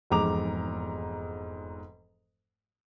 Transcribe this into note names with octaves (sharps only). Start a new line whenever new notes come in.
F1 E2 G#2 A#5 D6 F7